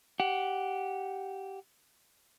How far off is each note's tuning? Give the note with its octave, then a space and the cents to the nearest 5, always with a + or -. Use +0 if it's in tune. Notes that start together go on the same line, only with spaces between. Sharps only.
G4 -10 F#5 +0